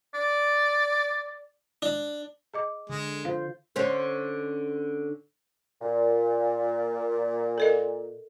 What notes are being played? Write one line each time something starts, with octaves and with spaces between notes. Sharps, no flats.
D5
D4
G#4 D#5 D6
D3 G#3
F4 C5 F5
D3 C#4 C5
A#2
A4 A#4 D#5